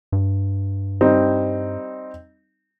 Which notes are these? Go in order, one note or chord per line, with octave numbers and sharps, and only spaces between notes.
G2
G3 C4 D#4